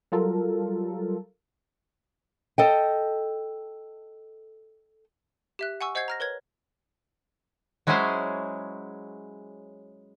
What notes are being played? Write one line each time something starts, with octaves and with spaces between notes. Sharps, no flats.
F#3 G3 F4 A4 A#4
A4 D#5 G5
G4 E5 F#6
F#5 G#5 C#6 E6
C5 D#5 F#5 G6 G#6 C7
A#5 F6 A#6
A#4 B4 C#5 G#6
F#3 G#3 C#4 E4 G#4 C5